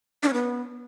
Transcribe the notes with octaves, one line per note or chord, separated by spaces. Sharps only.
D4
C#4
B3